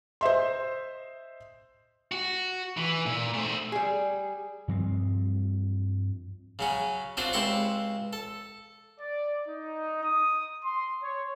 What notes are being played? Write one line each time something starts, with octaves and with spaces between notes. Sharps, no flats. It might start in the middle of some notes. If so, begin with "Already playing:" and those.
C5 D#5 E5 C6
F#4
E3
A#2
A3 C5
G3 G#4
G2 F3 G3 C4
C#3 F#3 C#4
C4 D4 F4 F#4 C5
C#2 C4 E4 G4 C6 C#6
A4
D5
D#4
D#6
C6
C#5